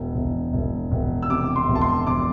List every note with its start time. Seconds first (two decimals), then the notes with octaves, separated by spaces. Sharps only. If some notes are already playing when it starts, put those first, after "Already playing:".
Already playing: E1
0.15 E1
0.53 E1
0.92 E1
1.23 E6
1.30 C3 D6
1.56 C6
1.68 E1
1.75 A5
1.81 C6
2.07 E1 D6